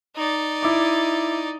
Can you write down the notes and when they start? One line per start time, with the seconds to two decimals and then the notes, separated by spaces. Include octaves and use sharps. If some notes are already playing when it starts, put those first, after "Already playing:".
0.16 D#4 D5
0.63 E4 D6